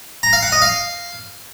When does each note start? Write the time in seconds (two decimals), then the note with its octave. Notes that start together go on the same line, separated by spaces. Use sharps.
0.23 A#5
0.33 F5
0.43 F#5
0.52 D#5
0.62 F5